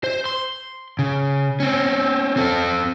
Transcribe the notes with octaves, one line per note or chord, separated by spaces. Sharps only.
C5
C6
C#3
C4 C#4
C4 A4